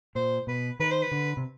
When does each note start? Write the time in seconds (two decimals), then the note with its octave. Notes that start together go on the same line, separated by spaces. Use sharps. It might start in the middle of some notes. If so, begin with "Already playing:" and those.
0.15 A#2 C5
0.47 B2 B4
0.80 D#3 B4
0.91 C5
1.02 B4
1.12 D3
1.37 C3